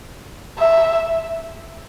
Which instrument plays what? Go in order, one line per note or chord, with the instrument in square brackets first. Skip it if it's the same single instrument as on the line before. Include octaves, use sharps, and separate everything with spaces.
[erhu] E5